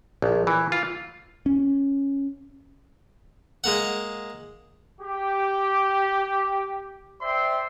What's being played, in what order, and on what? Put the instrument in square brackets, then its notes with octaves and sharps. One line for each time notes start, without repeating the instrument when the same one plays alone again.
[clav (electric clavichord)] A#1
E3
F4
[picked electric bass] C#4
[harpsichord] G#3 A#3 F#5
[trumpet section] G4
C5 D5 E5 G5 C6